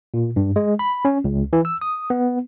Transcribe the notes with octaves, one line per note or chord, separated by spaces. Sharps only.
A#2
G2
G#3
B5
C#4
C#2
E3
E6
D#6
B3